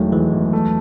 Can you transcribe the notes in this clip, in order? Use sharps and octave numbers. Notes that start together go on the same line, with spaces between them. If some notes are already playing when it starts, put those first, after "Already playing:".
Already playing: E1 D#3 F#3 A3
E3 G#3
E2
A3